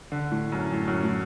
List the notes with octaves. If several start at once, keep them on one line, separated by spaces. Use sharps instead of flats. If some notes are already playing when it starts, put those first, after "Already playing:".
D3
A2
F#2
A2
F#2
A2